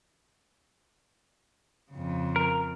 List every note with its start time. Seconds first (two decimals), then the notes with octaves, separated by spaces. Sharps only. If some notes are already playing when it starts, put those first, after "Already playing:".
1.91 F2 C#3
2.36 A#4